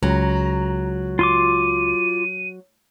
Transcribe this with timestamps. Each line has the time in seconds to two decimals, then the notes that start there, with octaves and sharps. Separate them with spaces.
0.03 C#2 F#3 A#5
1.19 F4 C6 D6 D#7